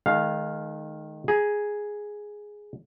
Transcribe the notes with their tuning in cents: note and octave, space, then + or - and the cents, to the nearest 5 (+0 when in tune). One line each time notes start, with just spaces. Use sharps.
D#3 -5 G#3 +35 F5 +0
G#4 +0 A#5 +25